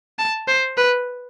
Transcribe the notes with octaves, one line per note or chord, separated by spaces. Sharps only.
A5
C5
B4